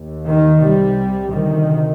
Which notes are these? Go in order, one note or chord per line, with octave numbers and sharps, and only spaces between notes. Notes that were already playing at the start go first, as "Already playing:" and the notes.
Already playing: D#2
D#3
C2 C3 G3
D2 C3 D#3